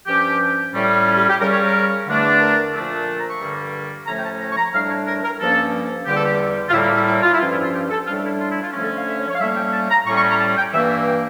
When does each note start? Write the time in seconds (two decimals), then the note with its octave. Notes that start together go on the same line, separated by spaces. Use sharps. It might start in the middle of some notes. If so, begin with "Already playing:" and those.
0.07 G2 F3 C#4 G4
0.74 A2 G3 C#4
1.07 F4
1.18 G4
1.29 G4
1.40 C#3 G3 C#4 A#4
1.51 C#5
1.62 A#4
2.07 E2 D3 A3 D4
2.40 A#4
2.74 A#2 F3 A3 D4
3.18 A#5
3.29 C#6
3.40 G2 D3 G3 A#3
4.06 A2 F3 A3 C#4 A#5
4.18 G5
4.23 A5
4.40 A#5
4.49 C#6
4.57 A#5
4.73 A2 G3 D4 F5
4.89 C#5
5.06 A#4
5.23 A#4
5.39 G2 F3 A#3 C#4 A4
6.06 E2 D3 G3 G4
6.16 A4
6.25 G4
6.69 F4
6.73 A2 G3 A#3 E4
6.84 E4
6.95 E4
7.06 E4
7.22 F4
7.33 E4
7.40 G2 F3 C#4 F4
7.51 E4
7.62 F4
7.73 G4
7.90 A4
8.06 A2 G3 D4 F4
8.23 E4
8.40 F4
8.51 E4
8.62 F4
8.73 D3 F3 A3 C#4
8.84 A4
8.95 F5
9.06 E5
9.17 C#5
9.28 C#5
9.35 F5
9.39 A2 G3 A#3 C#4 E5
9.56 G5
9.73 A5
9.90 A#5
10.06 A2 G3 C#4 C#6
10.17 C#6
10.28 A#5
10.39 A5
10.56 G5
10.73 G2 E3 A#3 E5
10.89 E5
11.06 G5